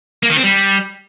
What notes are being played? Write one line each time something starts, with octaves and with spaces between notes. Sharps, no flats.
A#3
D#3
C4
G3